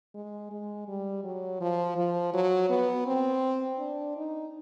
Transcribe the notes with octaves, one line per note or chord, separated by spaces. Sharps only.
G#3
G#3
G3
F#3
F3
F3
F#3
B3
C4
D4
D#4